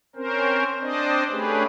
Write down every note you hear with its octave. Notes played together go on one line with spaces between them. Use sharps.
C4 C#4 A#4 C5
C4 D4 C5 D5 D#5
A3 C#4 D4 G4 G#4 B4